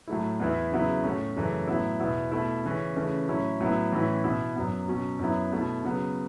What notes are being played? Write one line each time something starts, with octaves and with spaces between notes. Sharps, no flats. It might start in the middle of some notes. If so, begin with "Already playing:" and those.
A2 F#3 A3 E4
E2 E3 B3 E4
C#3 F#3 B3 E4
A2 A3 C#4
F#2 C#3 E3 A3
A2 F#3 B3 E4
E2 B2 B3 E4
B2 A3 E4
C#3 E3 C#4
C#3 E3 A3 C#4
A2 F#3 C#4 E4
A2 F#3 B3 E4
A2 E3 C#4 E4
B2 B3 E4
F#2 F#3 B3
B2 F#3 C#4
F#2 F#3 B3 E4
B2 A3 E4
C#3 F#3 B3